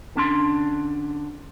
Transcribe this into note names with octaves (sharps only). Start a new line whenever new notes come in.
D3 C#4 D4 C6